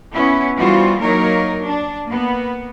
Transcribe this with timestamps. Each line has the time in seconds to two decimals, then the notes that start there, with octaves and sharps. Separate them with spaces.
0.13 B3 C#4 E4
0.57 E3 G3 B3 F4 F#4 C5
0.99 F#3 A#3 D#4 A#4 C#5
1.62 D4
2.07 A#3 B3